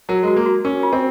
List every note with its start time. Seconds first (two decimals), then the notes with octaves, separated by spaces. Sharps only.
0.09 F#3 A#4
0.23 G#3 F#4
0.36 A#3
0.46 F#4
0.65 C#4 A#4
0.83 F4
0.93 C4